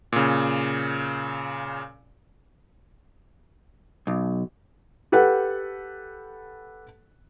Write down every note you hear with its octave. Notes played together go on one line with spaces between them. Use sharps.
A#2 C#3
B1
G4 A4 B4 F#5